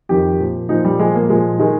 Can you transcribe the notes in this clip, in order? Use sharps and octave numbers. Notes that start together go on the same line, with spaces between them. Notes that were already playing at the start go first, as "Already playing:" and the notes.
F2 D#3 G4
A#2 F3
A#2 F3 D#4
G3
A#2 F3 G#3
A#3
A#2 F3 G#3
D#3 G#3